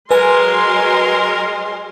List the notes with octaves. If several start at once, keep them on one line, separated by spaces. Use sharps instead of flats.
F#3 G#3 A#4 B4 G#5 C6